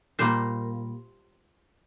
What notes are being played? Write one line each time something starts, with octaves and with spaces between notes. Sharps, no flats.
A#2 G3 A#3 C5